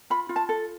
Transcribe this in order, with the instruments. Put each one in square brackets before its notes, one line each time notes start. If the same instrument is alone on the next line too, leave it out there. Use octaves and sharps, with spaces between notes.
[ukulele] F4 B5
F4
A5
A4